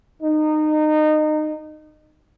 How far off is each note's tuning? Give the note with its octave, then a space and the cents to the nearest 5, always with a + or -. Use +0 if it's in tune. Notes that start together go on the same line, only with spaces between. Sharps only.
D#4 -25